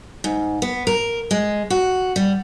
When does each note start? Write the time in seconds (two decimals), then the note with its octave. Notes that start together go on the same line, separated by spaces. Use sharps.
0.24 G#2
0.62 B3
0.87 A#4
1.31 G#3
1.70 F#4
2.16 G3